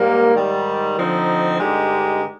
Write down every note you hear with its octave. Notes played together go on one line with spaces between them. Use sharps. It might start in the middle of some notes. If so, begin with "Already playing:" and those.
Already playing: G#2 G3 A#3
G#2 D#3 G3
D3 F3 C4 D#4
G2 D3 G#3 D#4 G4